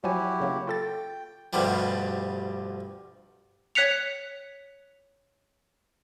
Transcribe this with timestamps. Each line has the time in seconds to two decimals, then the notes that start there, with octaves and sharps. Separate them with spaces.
0.04 F3 F#3 E4 F#4 G4 G#5
0.40 C#3 F#3 A#3
0.67 F4 A4 G5 A6
1.53 D2 G2 B2 D3 F3 G3
3.75 C#5 F#6 B6 C#7 F7